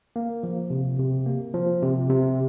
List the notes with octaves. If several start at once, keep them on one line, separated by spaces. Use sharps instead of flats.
A#3
F3
C3
C3
A#3
F3
C3
C3